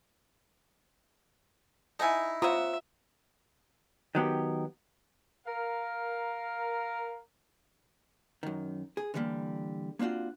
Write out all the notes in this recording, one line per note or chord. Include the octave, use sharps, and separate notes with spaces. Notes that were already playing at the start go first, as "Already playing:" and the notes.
D#4 E4 A4 F#5 G#5
C4 F4 C#5 E5 F#5 A#5 D#6
D#3 F#3 B3 G4
A#4 F5
F#2 D#3
G#4
D3 E3 F#3 G3 A#3
A#3 C4 D4 F4 F#4